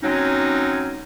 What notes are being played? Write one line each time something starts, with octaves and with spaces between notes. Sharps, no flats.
F#3 G#3 C4 C#4 D#4